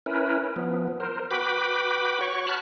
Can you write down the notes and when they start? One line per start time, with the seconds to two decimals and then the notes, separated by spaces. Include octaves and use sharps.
0.06 C#4 E4 A#4 B4
0.56 F3 B3
1.00 A#4 C5
1.31 F#4 B4 G5 B5 D6
2.21 F#4 C#5 C#6
2.47 A5 B5 F6 F#6